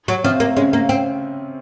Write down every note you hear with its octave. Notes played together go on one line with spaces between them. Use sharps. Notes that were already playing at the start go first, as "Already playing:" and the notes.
F#3
C3 F3 C4
A#3
C#3 G#3 C#4
A#3
C4